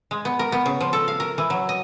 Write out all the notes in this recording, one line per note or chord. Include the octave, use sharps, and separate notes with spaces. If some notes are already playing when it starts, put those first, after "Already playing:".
G#3
B3
A#4
B3
C#3
F3
A4
F5
A#4
E3
F#3
D#5